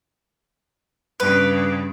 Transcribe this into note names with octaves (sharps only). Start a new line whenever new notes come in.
G2 C#3 B4